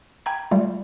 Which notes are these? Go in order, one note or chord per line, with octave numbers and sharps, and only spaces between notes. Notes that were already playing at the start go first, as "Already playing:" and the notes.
G5 G#5 A#5 B5 G#6
G3 A3 F4